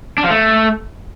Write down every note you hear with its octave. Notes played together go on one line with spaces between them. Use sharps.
D4
F3
A3